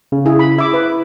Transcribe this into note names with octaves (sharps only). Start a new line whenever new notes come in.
C#3
E4 G#4
B5
E4 E5 D6
B4